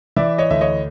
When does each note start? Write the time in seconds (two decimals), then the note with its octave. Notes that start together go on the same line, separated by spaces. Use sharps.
0.16 E3 D5 E5
0.38 C#5 D#5
0.50 D2 E5
0.61 C#5 D#5